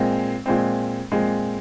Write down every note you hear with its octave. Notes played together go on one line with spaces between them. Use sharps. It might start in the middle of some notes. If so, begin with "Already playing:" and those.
Already playing: A#2 G#3 C4
A#2 G#3 C4
A#2 G#3 C4